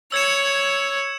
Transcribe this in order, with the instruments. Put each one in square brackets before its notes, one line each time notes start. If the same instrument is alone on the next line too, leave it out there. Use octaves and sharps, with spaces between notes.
[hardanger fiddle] C#5 [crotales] E6 G#6 C#7 E7